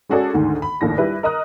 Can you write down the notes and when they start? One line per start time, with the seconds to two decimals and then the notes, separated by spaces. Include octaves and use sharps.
0.09 G#3 C#4 F#4 G#4 A4 D5
0.34 D2 G#2 D3 D#3
0.62 B5
0.81 A#1 D#2 A2 A#6
0.98 G3 E4 B4
1.23 A#4 D#5 A#5 D#6 F#6